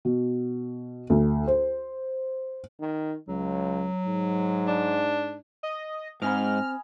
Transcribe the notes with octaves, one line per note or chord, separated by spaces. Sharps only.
B2
D2
C5
D#3
C#2 F#3
G#2
D4
D#5
G#2 C4 D#5 G#5 B5 F6